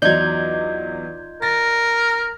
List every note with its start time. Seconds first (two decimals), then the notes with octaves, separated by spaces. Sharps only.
0.02 E2 F#3 D#4 F4 D5 G6 G#6
1.42 A#4 A6 A#6